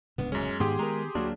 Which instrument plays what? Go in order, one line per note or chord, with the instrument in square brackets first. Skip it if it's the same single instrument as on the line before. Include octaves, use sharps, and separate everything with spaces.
[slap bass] D1 C#2 A2 [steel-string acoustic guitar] B3 D4
[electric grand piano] F#2 C#4 [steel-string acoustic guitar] G#3
[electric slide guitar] G#2 [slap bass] D#3 B3 [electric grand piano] G4 G#4 C6
[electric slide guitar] G#3 A#4 [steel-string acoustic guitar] A#5
[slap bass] D2 [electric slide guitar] F#3 A#3 D4 [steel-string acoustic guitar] F#4